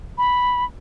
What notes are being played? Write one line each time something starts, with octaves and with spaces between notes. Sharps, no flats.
B5